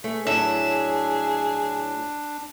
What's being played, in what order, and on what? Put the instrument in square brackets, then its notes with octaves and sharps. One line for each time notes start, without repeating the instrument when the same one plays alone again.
[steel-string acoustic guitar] A3 [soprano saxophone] G#4
[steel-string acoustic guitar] A2 F#3 [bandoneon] D4 [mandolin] E5